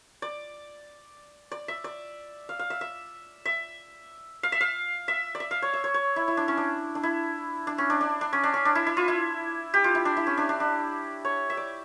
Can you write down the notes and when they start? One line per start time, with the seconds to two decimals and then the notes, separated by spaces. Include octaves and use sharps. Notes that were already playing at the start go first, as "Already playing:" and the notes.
0.22 D5
1.51 D5
1.68 E5
1.84 D5
2.49 F5
2.59 F5
2.70 E5
2.81 E5
3.45 E5
4.43 F5
4.52 E5
4.61 F5
5.08 E5
5.35 D5
5.40 E5
5.51 F5
5.62 C#5
5.73 E5
5.84 C#5
5.94 C#5
6.16 E4
6.28 E4
6.37 D4
6.48 C#4
6.57 D4
6.95 D4
7.03 E4
7.67 D4
7.78 C#4
7.90 D4
8.01 D4
8.21 D4
8.33 C#4
8.43 D4
8.54 C#4
8.65 D4
8.75 E4
8.86 E4
8.97 F4
9.08 E4
9.74 G4
9.84 F4
9.95 E4
10.05 D4
10.17 E4
10.27 C#4
10.37 D4
10.49 D4
10.60 D4
11.25 C#5
11.50 E5
11.57 D5